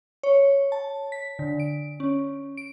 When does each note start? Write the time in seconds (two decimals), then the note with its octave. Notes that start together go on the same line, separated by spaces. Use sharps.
0.23 C#5
0.72 A5
1.12 B6
1.39 D3
1.60 D7
2.00 C#4
2.57 D7